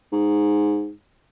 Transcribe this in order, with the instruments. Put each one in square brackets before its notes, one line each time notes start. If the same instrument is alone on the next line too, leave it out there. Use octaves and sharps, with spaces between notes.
[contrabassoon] G#2